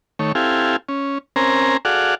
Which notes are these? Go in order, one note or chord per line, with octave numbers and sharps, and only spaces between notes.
D#3 A3 C#5
C4 E4 G4 A4 F5 G#5
C#4
C4 C#4 A#4 C5 G#5 A#5
F#4 G#4 A4 D5 F5 F#5